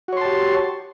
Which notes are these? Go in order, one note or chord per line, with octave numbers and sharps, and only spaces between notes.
F#4 G4 C#5 A5 C6